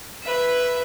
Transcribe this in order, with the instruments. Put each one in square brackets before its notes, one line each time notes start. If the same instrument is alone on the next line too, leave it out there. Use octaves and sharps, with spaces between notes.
[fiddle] B4 E5